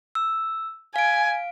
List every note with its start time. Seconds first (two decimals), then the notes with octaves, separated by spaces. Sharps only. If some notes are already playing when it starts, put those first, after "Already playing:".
0.15 E6
0.96 F5 G#5 D7